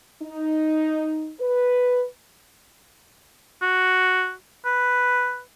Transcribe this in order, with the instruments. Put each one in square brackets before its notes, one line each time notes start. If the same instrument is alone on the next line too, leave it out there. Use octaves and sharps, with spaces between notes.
[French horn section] D#4
B4
[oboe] F#4
B4